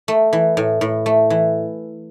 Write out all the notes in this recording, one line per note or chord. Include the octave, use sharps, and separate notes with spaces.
A3
E3
A2
A2
A3
E3